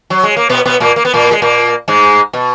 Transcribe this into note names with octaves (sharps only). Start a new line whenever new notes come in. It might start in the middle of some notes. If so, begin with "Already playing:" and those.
F#3
G#3
A#3
B2 B3
B2 B3
A#2 A#3
A#3
B3
A#2 A#3
G#3
A#2 A#3
G#2 G#3
B2